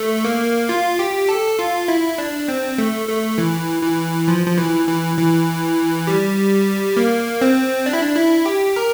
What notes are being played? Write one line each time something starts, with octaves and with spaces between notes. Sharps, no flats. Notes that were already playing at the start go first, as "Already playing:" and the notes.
Already playing: A3
A#3
F4
G4
A4
F4
E4
D4
C4
A3
A3
E3
E3
F3
F3
E3
E3
E3
G3
A#3
C4
D4
E4
D4
E4
G4
A#4